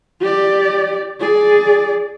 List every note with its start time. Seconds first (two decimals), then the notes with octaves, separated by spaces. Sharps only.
0.21 G4 D5
1.21 G#4 D5